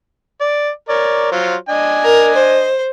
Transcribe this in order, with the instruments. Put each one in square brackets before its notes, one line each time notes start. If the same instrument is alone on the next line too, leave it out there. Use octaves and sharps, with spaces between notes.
[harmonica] D5
A#4 C#5 D5
F#3 F4 C5
D4 D#5 G#5
[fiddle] A#4
C5